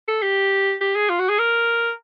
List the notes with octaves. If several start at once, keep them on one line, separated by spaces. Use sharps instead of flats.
A4
G4
G4
G#4
F4
F#4
G#4
A#4